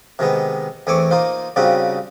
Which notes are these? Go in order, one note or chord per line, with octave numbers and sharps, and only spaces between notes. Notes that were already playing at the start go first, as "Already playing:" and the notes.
C3 D#3 G#3 B3
E2 A3 C4 G#5 C#6 D6
A#3 D#4 F4 C5
C#3 G3 C4 D#4 F4 F#4